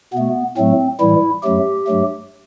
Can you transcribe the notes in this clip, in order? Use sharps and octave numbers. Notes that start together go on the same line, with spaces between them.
B2 A3 B3
A2 F#3 A3 C4
A2 E3 G3 E4
F#2 F#3 A3 G4
G2 F#3 A3